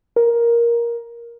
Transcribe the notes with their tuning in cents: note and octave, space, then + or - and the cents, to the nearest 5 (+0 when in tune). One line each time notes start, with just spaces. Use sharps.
A#4 +10